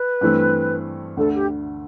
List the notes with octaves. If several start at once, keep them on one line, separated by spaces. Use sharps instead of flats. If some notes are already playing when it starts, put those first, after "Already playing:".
Already playing: B4
G2 E3 A3 C4
D2 D3 A3 A4
G4